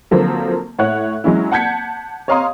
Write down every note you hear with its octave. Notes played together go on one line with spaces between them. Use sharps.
D3 F3 F#3 A#3 C4
A2 C#5 F#5 F#6
F#3 G#3 C#4 E4
F#5 A5 G6 G#6 B6 C#7
C#5 D#5 F5 A#5 C6 D#6